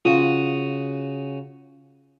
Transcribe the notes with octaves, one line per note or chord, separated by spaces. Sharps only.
C#3 F4 F#4 D#6